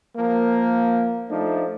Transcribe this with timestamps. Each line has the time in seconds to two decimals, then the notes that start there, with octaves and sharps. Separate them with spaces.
0.17 F3 A#3 A#4
1.29 F3 A3 D4 D#4